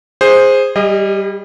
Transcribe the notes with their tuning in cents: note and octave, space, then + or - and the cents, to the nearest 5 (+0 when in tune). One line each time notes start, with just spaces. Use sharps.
G#4 -10 C5 +5
G3 +0 G#4 -45 D#5 +0